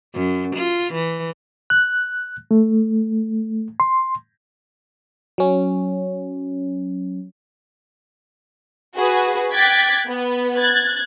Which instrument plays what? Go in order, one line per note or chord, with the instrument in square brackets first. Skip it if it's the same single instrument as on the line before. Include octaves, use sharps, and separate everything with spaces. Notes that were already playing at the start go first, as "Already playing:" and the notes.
[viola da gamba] F#2
F4
E3
[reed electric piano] F#6
A3
C6
[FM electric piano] F#3 C#4
[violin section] F#4 G#4 B4
G5 D6 F#6 G#6 A6 B6
B3
F#6 G#6 A6